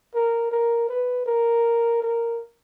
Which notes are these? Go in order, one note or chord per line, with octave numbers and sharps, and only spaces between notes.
A#4
A#4
B4
A#4
A#4